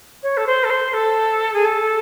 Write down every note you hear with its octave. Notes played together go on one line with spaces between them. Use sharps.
C#5
A4
C5
A4
C5
A4
G#4
A4